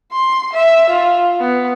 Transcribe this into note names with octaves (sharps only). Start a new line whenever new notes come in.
C6
E5
F4
B3